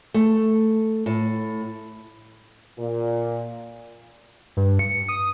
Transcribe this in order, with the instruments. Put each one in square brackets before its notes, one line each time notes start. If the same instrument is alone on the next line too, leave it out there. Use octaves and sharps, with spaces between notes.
[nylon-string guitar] A3
A2
[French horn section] A#2
[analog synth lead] G2
C#7
D#6